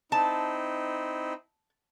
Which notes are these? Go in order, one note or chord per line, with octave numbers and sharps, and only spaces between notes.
C4 D#4 E4 A5